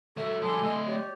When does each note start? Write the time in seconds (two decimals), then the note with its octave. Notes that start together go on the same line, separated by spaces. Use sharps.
0.17 F#3 A4 E5
0.42 F3 G3 G#5 C6
0.63 A3 D#5
0.86 G4 C#5 D5